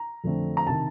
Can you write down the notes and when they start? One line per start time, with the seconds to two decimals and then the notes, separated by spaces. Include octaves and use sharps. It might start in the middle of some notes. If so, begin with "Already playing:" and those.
Already playing: A#5
0.24 F2 D3 A3 C4
0.57 A#5
0.67 C3 D#3 A5